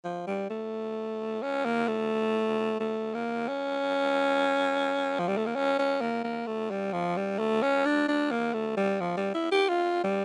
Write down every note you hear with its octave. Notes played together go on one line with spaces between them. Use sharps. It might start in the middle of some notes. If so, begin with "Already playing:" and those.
F3
G3
A3
C#4
A#3
A3
A3
A#3
C#4
F3
G3
A3
A#3
C#4
C#4
A#3
A#3
A3
G3
F3
G3
A3
C#4
D4
D4
A#3
A3
G3
F3
G3
E4
G4
F4
G3